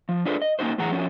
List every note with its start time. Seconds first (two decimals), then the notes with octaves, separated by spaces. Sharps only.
0.09 F3
0.25 D4 F4 G#4 A4 B4 C5
0.42 D#5
0.59 A#3 C#4 D#4 F#4 C5
0.78 F#2 A2 E3 G#4 F#5 A#5
0.92 F3 C#4 D#4 F#4